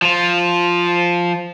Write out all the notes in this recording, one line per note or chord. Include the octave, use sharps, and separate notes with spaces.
F3 F4